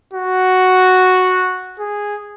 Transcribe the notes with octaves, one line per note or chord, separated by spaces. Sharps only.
F#4
G#4